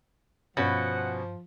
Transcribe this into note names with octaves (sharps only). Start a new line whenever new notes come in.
G2 B2 F3 C#4 F#5